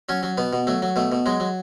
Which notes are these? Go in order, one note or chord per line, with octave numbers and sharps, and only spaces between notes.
F#3 C#4
F#3
B2 B3
B2
F#3 A3
F#3
B2 A3
B2
F#3 G#3
F#3